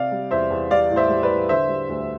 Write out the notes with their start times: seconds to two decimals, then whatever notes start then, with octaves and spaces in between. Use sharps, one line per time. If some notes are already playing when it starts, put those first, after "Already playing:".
Already playing: C3 D5 F5
0.12 G3
0.31 E2 C5 E5
0.50 E2
0.71 G3 D5 F5
0.91 A2
0.96 C5 E5
1.09 G3
1.23 B4 D5
1.30 A2
1.49 D3 C5 E5
1.68 G3
1.89 D2